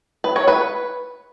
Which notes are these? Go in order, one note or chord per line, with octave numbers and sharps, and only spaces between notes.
B4
C#5
B4